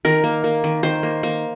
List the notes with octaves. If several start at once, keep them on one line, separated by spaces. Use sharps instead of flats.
D#3 A#4
A#3
A#3
D#3
D#3 C5
A#3
A#3